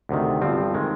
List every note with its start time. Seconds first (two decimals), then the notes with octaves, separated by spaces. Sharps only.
0.09 D2 C3 D#3
0.41 G1 G2 F3 C4
0.74 D#3 G#3